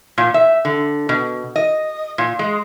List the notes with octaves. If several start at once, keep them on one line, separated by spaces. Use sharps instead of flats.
A#2
E5
D3
B2
D#5
A#2
G#3